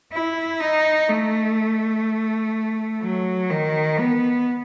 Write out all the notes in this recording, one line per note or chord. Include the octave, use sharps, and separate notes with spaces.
E4
D#4
A3
F#3
D#3
B3